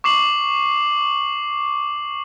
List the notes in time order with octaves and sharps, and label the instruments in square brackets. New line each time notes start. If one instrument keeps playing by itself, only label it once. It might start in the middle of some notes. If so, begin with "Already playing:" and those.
[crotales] C#6 D6 C7 F#7